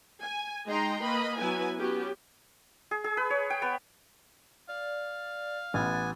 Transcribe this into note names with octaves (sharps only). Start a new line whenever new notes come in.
G#5
G#3 D#4 D#5 G5 A#5 C6
A#3 B4 D#5 B5
F#3 B3 E4 B4 G#5
B3 C#4 F#4 G4
G#4
G#4
B4
C#5
G5
B3
D5 F5
A1 B3 G#5 A6